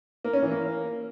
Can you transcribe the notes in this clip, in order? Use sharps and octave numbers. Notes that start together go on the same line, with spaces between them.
A#3
C#4
E3
A#3